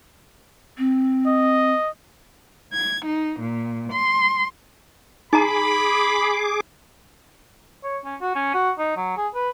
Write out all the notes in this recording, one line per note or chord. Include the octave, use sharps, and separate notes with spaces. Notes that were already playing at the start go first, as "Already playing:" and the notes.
C4
D#5
G#6
D#4
A#2
C6
D#4 G#4 A#5 B5 D6
C#5
C#4
F#4
C#4
F#4
D#4
F#3
G#4
B4